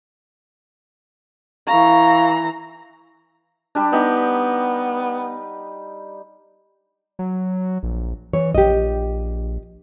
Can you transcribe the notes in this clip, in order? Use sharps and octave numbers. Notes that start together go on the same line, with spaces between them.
E3 F5 A#5 C#6
G3 D4
B3 D#4 G4
F#3
A#1
E3 C#5
A#1 G4 D#5